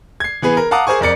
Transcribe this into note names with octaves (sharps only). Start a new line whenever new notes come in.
G#6 C7
E3 B3 G#4 B4
A#4
F5 F#5 A5 A#5 D6 D#6
G#4 A#4 C5 G#5 C#6
F2 A#4 D5 C#7